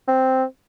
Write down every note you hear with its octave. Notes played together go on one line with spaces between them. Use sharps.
C4